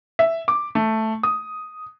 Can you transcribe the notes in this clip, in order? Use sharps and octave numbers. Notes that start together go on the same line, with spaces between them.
E5
D6
A3
D#6